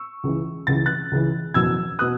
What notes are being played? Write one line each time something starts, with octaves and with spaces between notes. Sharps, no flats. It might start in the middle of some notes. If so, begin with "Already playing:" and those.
Already playing: C#6 E6
C#2 C#3 E3
C#2 C#3 E3 A6
F#6 A6
C#2 C#3 E3
F#1 E2 B2 E6 G#6
B2 D#6 F#6